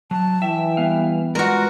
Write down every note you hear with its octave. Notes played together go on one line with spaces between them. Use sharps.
F#3 A5
E3 E5 G5
G3 B3 F5
G#3 F4 F#4 A#4 B4 D5